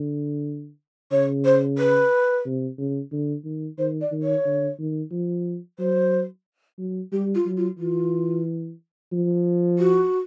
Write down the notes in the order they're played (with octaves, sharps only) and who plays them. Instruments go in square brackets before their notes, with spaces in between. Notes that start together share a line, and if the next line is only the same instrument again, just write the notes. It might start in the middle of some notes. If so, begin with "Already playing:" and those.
Already playing: [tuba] D3
[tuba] C#3 [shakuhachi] C#5
[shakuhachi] C5
B4
[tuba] C3
C#3
D3
D#3
[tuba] D#3 [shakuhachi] C5
[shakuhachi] D5
[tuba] D#3
[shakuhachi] C#5
[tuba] D3
D#3
F3
[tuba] F#3 [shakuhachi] C5
[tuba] F#3
[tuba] G3 [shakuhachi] G4
[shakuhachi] F4
[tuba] F#3
[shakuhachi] F4
[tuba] E3 [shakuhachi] F4
[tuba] F3
[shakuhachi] F#4